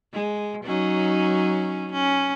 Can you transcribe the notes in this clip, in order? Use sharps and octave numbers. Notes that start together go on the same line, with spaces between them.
G#3
F#3 C#4 D#4
C#4